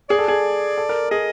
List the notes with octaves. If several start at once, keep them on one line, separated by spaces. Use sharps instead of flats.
G#4 D5
A4
G#4
A4
A#4
G#4 D#5